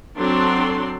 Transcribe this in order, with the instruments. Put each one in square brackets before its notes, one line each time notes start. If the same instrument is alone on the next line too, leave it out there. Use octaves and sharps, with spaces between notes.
[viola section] F#3 C4 D4 A4 C6